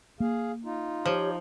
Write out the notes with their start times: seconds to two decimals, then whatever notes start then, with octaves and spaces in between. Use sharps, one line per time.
0.20 A#3 G#4 F5
0.64 D#4 F4
1.06 F3 G4 C5 C#5